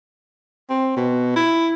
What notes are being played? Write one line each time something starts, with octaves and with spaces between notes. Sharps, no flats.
C4
B2
E4